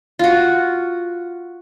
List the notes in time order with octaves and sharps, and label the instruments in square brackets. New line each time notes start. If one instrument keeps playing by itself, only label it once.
[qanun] F4 F#4